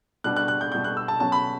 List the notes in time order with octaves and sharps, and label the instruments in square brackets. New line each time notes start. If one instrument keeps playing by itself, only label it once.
[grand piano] B2 G3 B3 D4 F#6
F#6
F#6
G6
B2 G3 B3 D4 G6
F#6
E6
A5
B2 F#3 C#4 A5
B5